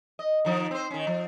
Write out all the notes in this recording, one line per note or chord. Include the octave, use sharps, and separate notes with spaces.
D#5
D#3 F3 D#4
C4 C5
D#3 C#4
F3